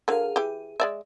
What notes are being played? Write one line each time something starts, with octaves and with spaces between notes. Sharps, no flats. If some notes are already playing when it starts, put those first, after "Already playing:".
D3 F#3 G#4 A#4 F5
E3 G4 G#4
G#3 D5 E5